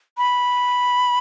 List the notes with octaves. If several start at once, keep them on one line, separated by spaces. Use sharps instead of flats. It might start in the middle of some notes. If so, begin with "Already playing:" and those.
B5